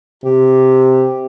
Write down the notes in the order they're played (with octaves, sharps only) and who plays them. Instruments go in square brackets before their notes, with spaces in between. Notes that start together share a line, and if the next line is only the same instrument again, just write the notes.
[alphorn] C3 [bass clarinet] G4